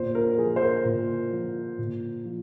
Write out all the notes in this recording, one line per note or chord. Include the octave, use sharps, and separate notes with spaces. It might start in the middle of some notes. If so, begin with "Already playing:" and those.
Already playing: A#2 C5
A#4
F3 G#4
C5
A#4
A#2
F3
A#2
F3